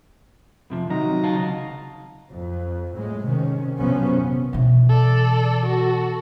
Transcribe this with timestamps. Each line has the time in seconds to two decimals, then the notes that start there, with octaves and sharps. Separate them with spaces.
0.70 F2 C3 F3
0.90 C3 D#3 F#3 D#4 A#5
1.23 C#2 F5 A5
2.31 F2
2.95 A2 G#3
3.25 C3 D#3 C#4
3.78 A#1 F#2 C3 F3 B3 C#4
4.53 B2 E3
4.89 A4 D5
5.66 F#4 A4